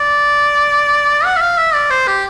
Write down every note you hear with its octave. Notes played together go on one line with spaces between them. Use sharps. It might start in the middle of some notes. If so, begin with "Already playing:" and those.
Already playing: D5
F#5
E5
F5
E5
D5
C5
G4